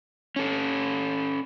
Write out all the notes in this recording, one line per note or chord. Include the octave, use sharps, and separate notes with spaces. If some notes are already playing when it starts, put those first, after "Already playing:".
C#4 A4